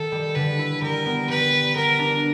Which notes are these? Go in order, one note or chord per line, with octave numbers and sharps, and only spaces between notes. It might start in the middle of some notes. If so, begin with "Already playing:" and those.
Already playing: D#3 A4
G3
D3 B4
E4
G3 A#4
B3
G3 B4
G3
B3 A#4
D4